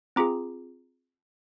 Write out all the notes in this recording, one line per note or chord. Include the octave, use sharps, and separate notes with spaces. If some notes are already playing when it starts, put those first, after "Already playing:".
C4 F4 G#4 A#5 D6